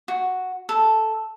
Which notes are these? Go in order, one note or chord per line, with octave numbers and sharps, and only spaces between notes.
F#4
A4